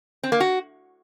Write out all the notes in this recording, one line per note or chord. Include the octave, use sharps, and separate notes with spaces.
C4
A#3
F#4